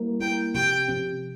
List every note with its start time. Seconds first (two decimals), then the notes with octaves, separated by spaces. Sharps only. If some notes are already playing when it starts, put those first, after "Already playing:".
Already playing: G3 A#3 E4 A#4
0.20 G3 A#3 E4 A#4 G5
0.54 C3 F3 C4 G4 G5
0.88 C3 F3 C4 G4